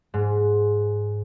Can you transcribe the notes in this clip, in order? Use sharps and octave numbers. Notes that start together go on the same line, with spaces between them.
G#2